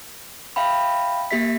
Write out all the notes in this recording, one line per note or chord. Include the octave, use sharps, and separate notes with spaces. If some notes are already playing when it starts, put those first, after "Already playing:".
E5 F5 G5 B5
A#3 G4 E5 B6